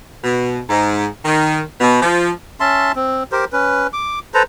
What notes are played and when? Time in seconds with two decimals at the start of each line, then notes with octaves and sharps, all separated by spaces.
0.24 B2
0.70 G#2
1.25 D#3
1.81 B2
2.02 F3
2.60 C#4 E5 A5 C6
2.96 C4
3.32 G4 A#4 C5
3.53 C#4 B4
3.93 D6
4.34 A4 B4 C5 A#5